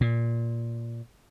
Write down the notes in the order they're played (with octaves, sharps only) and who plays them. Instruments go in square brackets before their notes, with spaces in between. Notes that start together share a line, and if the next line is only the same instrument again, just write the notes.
[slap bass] A#2